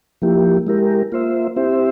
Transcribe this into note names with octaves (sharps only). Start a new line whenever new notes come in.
F3 A#3 E4 G4
G#3 E4 G4 A#4
A#3 F4 C5 E5
C4 E4 G4 C5 E5